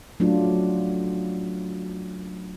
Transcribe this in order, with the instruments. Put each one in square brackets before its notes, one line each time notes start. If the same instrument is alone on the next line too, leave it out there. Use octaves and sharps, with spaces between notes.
[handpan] F#3 A3 D4 F4